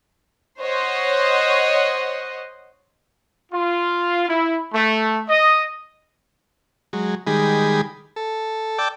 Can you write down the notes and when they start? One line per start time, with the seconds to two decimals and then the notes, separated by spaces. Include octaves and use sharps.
0.60 C5 C#5 D#5 F#5
3.52 F4
4.29 E4
4.73 A3
5.28 D#5
6.93 F#3 G#3
7.27 D#3 G3 G#3 G#4 B5
8.16 A4
8.78 D5 G5 A5 D6 E6